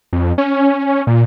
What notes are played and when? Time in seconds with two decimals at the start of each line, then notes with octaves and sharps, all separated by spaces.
0.13 F2
0.38 C#4
1.07 A#2